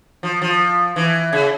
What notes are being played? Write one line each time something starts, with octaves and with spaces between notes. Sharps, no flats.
F3
F3
E3
C#3